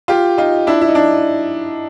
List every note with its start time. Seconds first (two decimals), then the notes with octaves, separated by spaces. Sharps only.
0.08 F4 G4
0.38 D#4 F4
0.67 D4 E4
0.81 E4
0.88 D#4
0.95 D4